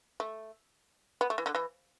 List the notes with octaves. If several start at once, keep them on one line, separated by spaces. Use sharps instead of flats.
A3
B3
A3
E3
D3
E3